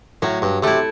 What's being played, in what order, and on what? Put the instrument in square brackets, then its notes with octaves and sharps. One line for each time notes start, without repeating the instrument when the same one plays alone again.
[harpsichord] A2 [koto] F#3
[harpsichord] G2
[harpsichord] C3 [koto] A3 E4